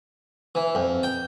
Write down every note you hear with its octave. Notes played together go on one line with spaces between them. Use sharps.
E3
F2
G5